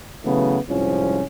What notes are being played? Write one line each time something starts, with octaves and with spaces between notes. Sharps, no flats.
C#3 E3 F#3 A3 B3
C2 F2 G#2 F3 C#4